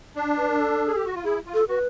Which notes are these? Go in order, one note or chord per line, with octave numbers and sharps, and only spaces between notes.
D4
B4
A#4
A4
G#4
G4
F#4
F4
E4 G#4
F4
A4
F#4 B4